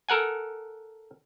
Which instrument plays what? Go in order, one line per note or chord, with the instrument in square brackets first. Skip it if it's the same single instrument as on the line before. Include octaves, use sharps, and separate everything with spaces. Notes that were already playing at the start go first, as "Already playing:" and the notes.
[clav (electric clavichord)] A4 A#4 F#5 G#5